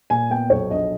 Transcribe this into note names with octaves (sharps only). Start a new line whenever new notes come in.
A#2 G#5
B3 G5
B1 C#5
A#1 D#5